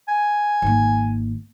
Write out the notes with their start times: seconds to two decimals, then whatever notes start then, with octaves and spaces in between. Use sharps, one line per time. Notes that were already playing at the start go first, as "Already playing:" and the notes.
0.08 G#5
0.62 G#1 A#3